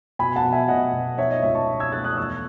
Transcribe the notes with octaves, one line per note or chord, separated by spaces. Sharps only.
B2 G#5 B5
F#5 A5
B2
E5 G#5
B2 D#5 F#5
B2
D#4 C#5 E5
D#5
C#2 C#5 E5
A5 C#6
B2
E6 G#6
A3 F#6 A6
D#6 F#6
E2 C#6 E6